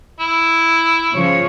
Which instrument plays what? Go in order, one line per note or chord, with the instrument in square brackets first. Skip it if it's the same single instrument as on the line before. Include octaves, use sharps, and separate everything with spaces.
[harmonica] E4
[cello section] C#3 F3 C#5